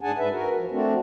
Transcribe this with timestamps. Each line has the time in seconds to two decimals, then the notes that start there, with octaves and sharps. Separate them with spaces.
0.01 G#2 D4 G#4 F#5 G#5 A5
0.18 G#2 B4 E5
0.32 F#4 A#4
0.57 F3
0.71 A3 C4 D4 F#4